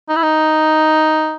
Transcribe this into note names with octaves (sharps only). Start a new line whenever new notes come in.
D#4
E4
D#4